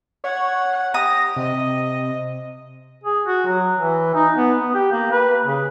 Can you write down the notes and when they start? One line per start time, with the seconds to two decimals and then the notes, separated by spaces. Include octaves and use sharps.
0.24 C#5 F#5
0.94 G4 D#6 A#6
1.36 C3 D#5
3.04 G#4
3.26 F#4
3.47 F#3
3.79 E3
4.15 D#4
4.36 B3
4.61 B3
4.74 G4
4.91 A#3
5.12 B4
5.45 C#3